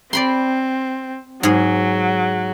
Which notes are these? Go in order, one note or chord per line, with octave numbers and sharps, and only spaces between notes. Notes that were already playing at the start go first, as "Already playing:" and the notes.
C4 D5 B5 C6
G#2 F#3 G#4